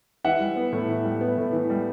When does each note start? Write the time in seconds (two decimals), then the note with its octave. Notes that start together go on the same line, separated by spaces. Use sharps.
0.24 E3 E5 F#5
0.40 G3
0.56 B3
0.73 A2
0.88 E3
1.05 G3
1.21 B3
1.37 A2
1.53 E3
1.70 G3